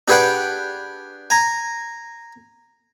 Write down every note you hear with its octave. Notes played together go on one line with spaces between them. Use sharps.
D4 G4 G#4 B4 F#5 G5
G#5 A#5